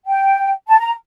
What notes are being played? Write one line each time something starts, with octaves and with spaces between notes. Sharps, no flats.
G5
A5
A#5